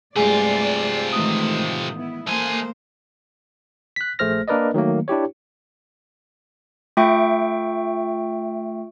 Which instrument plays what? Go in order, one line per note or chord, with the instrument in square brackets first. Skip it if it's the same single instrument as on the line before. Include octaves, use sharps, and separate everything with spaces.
[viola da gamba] G2 G#3 A3 [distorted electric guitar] C3 F4 [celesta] G#4 G#5 [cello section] D5
[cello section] A2 A3 [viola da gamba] D#3 E3 G#3 [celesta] D#6
[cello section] B3 E4
[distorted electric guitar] A3 G#5 [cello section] A#3 [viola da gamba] C5
[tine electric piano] F#6 B6
A#1 A3 G#4 C5 F6 A#6
A#3 D4 A#4 B4 D5 D#5
D#3 F#3 A3 A#3
D4 E4 G4 C#5
[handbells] A3 F4 E5 G5 C#6 D7